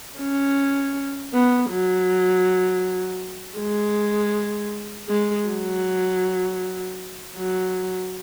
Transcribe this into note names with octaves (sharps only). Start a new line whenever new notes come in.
C#4
B3
F#3
G#3
G#3
F#3
F#3